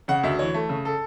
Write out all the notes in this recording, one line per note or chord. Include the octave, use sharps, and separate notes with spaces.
C#3 F#5
D2 E5
E3 C#5
A3
C#3
A4